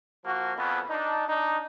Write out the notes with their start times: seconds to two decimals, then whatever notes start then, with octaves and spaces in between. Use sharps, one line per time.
0.25 F3 A#3 F#4
0.56 F2 C#3 F3 B3
0.89 D4 D#4
1.28 D4 D#4